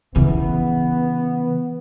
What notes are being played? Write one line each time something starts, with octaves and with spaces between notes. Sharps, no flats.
C#3 E3 B3